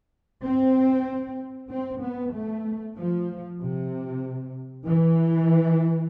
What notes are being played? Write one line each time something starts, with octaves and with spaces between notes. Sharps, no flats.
C4
C4
B3
A3
F3
C3
E3